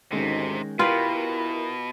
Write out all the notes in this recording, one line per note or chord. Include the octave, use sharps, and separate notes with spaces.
D2 G#2 C3 D#3 G#3 C#4
B2 E4 F4 G4 A#4 B4